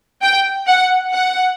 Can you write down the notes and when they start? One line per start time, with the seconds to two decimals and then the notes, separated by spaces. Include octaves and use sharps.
0.22 G5
0.67 F#5
1.13 F#5